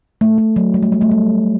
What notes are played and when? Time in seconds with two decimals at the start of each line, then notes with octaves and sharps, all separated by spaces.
0.21 A3
0.38 A3
0.56 F#3
0.74 G3
0.83 A3
0.92 G3
1.01 A3
1.12 G3